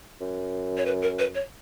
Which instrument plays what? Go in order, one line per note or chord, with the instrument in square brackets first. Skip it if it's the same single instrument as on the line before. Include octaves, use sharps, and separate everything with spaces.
[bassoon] F#2
[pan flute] C#5
B4
A#4
B4
C#5